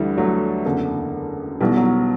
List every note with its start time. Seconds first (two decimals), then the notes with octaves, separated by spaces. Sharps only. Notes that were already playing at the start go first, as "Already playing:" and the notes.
Already playing: D2 D3 E3 G3
0.17 F#3 A3
0.65 F#1 E2 D3
1.60 B1 B2 E3 G3
1.76 F#3